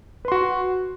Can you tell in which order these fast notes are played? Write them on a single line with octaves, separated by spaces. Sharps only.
B4 C6 F#4